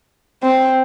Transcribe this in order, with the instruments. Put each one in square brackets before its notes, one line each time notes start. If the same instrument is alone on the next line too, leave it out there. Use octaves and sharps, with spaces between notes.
[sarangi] C4